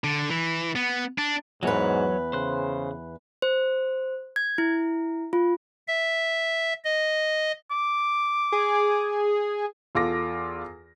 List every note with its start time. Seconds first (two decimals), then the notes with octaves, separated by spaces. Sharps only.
0.04 D3
0.29 E3
0.76 B3
1.18 D4
1.63 E2 G#2 F#3 B4 C#5
2.33 C#3 C5 F#6
3.42 C5
4.36 G#6
4.58 E4
5.33 F4
5.88 E5
6.85 D#5
7.71 D6
8.52 G#4
9.95 E2 F4 A4 D6 A#6